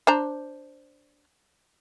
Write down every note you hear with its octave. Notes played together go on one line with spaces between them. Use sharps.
D4 C5 A#5